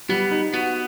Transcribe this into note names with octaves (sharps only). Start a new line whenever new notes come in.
G3 B3
D#4
B3 F#4